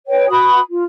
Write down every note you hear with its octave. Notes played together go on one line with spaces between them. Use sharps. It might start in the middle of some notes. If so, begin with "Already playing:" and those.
B4 C#5 G5
F#4 B4 B5 D#6
F4